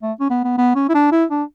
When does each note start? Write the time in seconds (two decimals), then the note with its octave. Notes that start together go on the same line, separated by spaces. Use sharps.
0.02 A3
0.20 C#4
0.30 B3
0.44 B3
0.58 B3
0.75 C#4
0.89 E4
0.94 D4
1.12 E4
1.30 D4